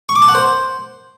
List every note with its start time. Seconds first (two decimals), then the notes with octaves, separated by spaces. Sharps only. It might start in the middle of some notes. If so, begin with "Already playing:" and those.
0.09 C#6
0.16 D6
0.22 A5
0.28 F#5
0.35 C5